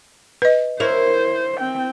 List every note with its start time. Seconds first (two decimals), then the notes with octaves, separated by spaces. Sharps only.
0.42 B4 D#5
0.80 E4 A#4 C5 C#5
1.60 C4 G5